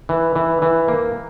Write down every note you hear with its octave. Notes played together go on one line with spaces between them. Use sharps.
E3
E3
E3
A#3